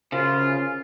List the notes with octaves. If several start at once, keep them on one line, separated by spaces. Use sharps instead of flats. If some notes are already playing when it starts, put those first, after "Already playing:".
F#2 C#3 F3 F4